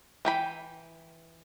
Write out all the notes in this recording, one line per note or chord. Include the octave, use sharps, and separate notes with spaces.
E3 G5 B5